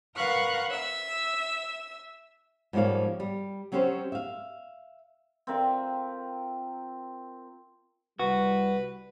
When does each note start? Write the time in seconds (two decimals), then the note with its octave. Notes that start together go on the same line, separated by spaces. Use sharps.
0.16 A#4 B4 F5 F#5 C#6 F#6
0.70 E5 E6
2.73 G#2 F3 G3 A#3 C#5 F5
3.20 G3
3.72 F#3 C4 C#4 G4 A#4 C5
4.12 E5 F5
5.47 C4 F4 A#4 E5
8.19 C2 G3 F#4 B4